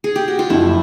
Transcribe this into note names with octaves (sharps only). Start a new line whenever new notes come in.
G#4
G4
F#4
F4
F#1 F2 D3 E4